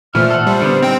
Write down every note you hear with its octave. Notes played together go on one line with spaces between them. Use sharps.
A#2 E3 A3 C5 E5 F6
A4 F#5
G3 C5
D3 B3
C4 D#4 G5